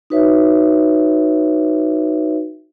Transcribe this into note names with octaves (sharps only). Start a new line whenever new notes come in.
D#4 F#4 B4 C#5 E5